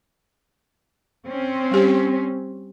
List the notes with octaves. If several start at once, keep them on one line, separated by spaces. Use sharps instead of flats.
C4 C#4
G3 G4